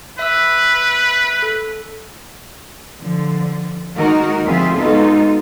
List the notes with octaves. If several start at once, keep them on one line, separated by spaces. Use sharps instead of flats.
B4 E5 E6
A4
D3 F3
D#3 G#3 A#3 D#4 F#4 A#4
D2 F3 C4 F4 G#4 E5
G#3 B3 D#4 F4 F#4 A4